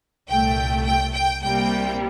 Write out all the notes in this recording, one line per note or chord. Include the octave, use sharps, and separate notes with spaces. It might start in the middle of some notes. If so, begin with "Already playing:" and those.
C2 A#2 A3 G5
G5
G5
C2 C3 G3 A#3 G5